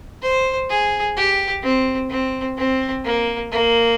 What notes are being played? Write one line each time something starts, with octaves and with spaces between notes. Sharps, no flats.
C5
G#4
G4
C4
C4
C4
A#3
A#3